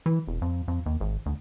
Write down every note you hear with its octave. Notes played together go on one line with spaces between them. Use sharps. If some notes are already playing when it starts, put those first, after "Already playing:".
E3
E1
F2
F2
D#2
G#1
D2